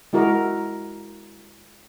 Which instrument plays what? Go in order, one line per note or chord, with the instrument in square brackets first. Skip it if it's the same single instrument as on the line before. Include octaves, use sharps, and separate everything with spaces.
[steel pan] G#3 E4 F#4 A#4